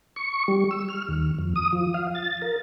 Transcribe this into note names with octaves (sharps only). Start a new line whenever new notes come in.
C#6
G3
E6
F6
D#2
F2
D#6
F3
F5
A6
A#4